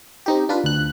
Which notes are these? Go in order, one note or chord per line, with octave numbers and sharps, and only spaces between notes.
C4 D#4 G4
D4 F4 B4
D2 F#6